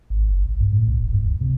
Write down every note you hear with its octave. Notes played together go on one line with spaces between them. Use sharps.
G#1
F#1
A#1
G2
A2
C2
D#1
G2
C#2
C3